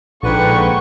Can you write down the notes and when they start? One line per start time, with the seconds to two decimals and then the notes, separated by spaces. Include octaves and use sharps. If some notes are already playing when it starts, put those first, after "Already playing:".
0.23 A#1 G#2 D3 B4 G5 C#6